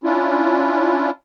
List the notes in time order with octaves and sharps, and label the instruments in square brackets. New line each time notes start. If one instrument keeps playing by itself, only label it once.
[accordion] C#4 D4 E4 F4